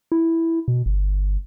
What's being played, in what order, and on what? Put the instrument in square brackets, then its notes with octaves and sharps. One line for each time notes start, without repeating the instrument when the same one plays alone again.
[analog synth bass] E4
B2
G1